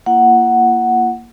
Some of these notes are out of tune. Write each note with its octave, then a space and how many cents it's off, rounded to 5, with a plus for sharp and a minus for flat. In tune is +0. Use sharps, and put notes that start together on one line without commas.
A#3 +0 E4 +40 F#5 +0